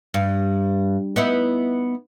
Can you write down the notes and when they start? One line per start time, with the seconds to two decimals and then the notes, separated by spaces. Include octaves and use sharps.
0.14 G2
1.16 B3 D#4 E4